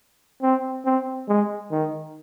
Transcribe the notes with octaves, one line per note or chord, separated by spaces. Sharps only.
C4
C4
G#3
D#3